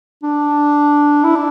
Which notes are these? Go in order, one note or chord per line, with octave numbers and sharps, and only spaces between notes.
D4
E4
D4